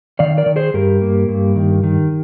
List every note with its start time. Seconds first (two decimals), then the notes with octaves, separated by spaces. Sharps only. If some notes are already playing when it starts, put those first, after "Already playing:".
0.19 D#3 D5 F5
0.38 A#4 D5
0.46 D#3
0.56 G#4 C5
0.74 G2 G4 A#4
1.02 A#3
1.29 G2
1.56 D#3
1.84 D#3